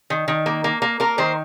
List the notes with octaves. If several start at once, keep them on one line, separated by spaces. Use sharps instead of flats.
D#3
D#3
A#3
A#3
A#3
A#3 A#4
D#3 C5